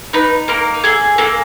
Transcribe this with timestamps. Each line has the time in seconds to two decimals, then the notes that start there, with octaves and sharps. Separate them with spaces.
0.13 D#4 B4
0.48 A#3 A#4
0.84 G#4 A4
1.18 A#3 A4